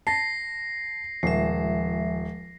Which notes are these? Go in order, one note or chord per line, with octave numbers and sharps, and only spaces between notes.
A5 A#6 C7
D#1 F3 G#3 E5